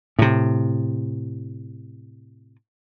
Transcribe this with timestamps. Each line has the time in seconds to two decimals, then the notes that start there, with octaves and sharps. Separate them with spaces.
0.19 A2 C3